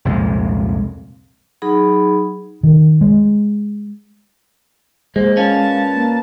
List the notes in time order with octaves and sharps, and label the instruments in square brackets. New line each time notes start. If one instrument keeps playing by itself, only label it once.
[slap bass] C2 F2 A#2 G#3
[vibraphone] F#3 D#4 G#4 B5
[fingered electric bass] D#3
G#3
[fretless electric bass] G#3 [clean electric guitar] A#3 [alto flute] C5
[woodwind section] A#2 B4 A5 [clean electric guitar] C#4 [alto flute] F5
[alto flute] A#3